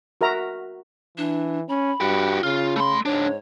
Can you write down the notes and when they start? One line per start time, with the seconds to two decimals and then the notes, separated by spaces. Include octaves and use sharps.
0.21 F#4 A#4 E5 A#5
1.17 E3 D4
1.68 C#4 B5
2.00 G2 F#4 G4
2.43 C#3 F4
2.76 A3 B5 C6
3.06 C#2 G#2 D4 C#5